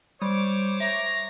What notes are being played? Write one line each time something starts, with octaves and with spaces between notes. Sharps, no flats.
G3 C5 C#5 D6
E5 A#5